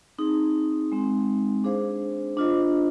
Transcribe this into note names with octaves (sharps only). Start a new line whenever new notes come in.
C4 D#4 G#4
G#3 C4 D#4
D4 G#4 C5 F5
D4 F4 C5 D#5